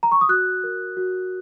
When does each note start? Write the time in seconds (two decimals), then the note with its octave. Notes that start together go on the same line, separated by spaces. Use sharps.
0.03 A#5
0.12 C#6
0.21 D#6
0.29 F#4 F#6
0.64 A#4
0.97 F#4